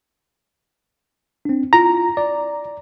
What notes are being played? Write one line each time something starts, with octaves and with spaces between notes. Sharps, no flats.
C4 D4
E4 F4 A#5
D5